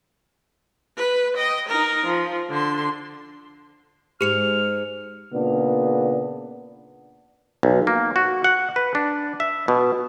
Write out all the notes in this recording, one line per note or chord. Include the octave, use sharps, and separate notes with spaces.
B4
D#5 G5
D#4 A#4
F3
D3 C6
G#2 G#3 G4 F6 C#7 F7
A#2 C#3 B3 D4
B1
A#3
F#4
F#5
B4
D4
E5
B2